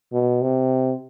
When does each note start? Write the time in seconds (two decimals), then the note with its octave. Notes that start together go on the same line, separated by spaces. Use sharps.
0.13 B2
0.42 C3